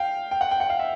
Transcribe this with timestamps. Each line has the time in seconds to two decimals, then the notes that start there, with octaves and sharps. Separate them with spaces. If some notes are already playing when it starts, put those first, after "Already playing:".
Already playing: F5 G5
0.31 G5
0.41 F#5
0.51 G5
0.60 F#5
0.70 F5
0.79 E5